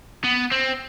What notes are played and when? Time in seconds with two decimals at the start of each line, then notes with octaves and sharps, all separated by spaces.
0.24 B3
0.52 C4